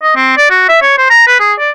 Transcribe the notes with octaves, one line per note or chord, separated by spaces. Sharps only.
D#5
C4
D5
F#4
E5
C#5
C5
A#5
B4
G#4
D5